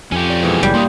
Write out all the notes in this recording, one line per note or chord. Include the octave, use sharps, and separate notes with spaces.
F2 C#4 G4
D5
B2 E3 G#3
F#1 G3
E2 A2 A#3 C6 D#6